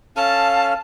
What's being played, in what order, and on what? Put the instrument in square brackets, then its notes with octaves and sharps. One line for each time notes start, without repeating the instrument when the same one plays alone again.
[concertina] C#4 A4 F6 [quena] F5 [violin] A5